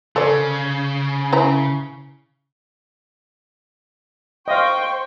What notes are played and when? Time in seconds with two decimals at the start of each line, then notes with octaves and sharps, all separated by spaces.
0.16 C#3 A4 C5 D5
1.33 C#4 E4 A#5
4.48 C5 D#5 F5 G5 C6 C#6